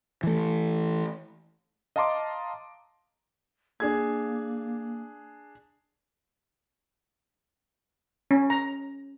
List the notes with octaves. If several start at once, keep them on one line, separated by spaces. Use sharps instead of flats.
E3 A3
D#5 F5 A5 A#5 C6 D6
A#3 D4 G#4 G#6
C#4
A#5